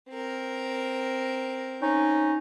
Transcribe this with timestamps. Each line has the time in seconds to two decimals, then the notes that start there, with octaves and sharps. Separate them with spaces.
0.11 C4 A#4
1.82 C#4 D#4